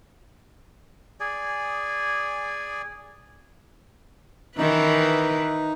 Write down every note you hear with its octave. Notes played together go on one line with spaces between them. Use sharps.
G#4 D5 G#5
D#3 E3 D#4 B4